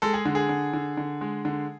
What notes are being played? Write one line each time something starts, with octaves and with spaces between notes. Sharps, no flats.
G#3 A4
G#4
D3
G#4
D3
D3
D3
G#3
D3